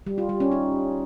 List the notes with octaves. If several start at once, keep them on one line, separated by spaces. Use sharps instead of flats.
G3
F4
G3
C#4
D#4